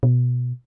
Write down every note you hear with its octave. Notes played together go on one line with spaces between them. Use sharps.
B2